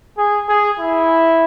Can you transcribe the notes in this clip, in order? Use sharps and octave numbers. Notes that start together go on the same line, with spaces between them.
G#4
G#4
E4